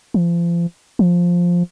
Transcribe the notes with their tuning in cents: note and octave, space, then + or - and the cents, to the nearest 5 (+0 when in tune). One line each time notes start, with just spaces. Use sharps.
F3 -35
F3 +5